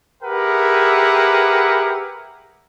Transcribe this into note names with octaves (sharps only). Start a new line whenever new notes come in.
G4 G#4 A#4 B4 E5 F#5